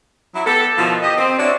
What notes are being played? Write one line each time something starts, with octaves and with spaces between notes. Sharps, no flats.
F#3 E4
B3 G4 A4
B2 D#3 F3 E4 F5
G4 D#5
C4
D4 E4 F#4 C#5 D5